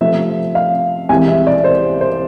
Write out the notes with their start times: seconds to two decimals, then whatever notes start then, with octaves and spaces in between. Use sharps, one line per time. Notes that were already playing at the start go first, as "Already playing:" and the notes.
0.01 C3 F3 A3 C4 E5
0.55 F5
1.09 C2 C3 E3 G#3 G#5
1.28 E5
1.47 D5
1.64 C5
2.01 C5